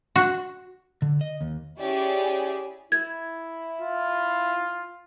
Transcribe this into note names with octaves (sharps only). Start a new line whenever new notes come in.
F#4
D3
D#5
D#2
C#4 E4 G4 G#4 D5 G#5
E4 G#6
F4